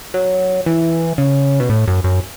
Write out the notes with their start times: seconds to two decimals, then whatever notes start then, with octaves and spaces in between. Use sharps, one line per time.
0.14 F#3
0.66 E3
1.18 C#3
1.60 B2
1.69 A2
1.88 F#2
2.04 F#2